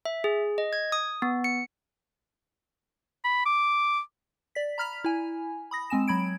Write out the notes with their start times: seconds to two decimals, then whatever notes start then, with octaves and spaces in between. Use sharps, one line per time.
0.05 E5
0.24 G#4
0.58 D#5
0.73 G#6
0.92 D#6
1.22 B3
1.44 C#7
3.24 B5
3.46 D6
4.55 D5 B6
4.78 A#5 B5 F6 B6 F7
5.04 E4 G#5
5.71 B5 D#6 A#6
5.90 G#3 C4 G#5 E7
6.08 F#3 B5 G#6 D7